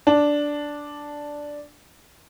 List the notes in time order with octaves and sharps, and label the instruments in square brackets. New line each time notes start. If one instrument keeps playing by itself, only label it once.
[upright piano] D4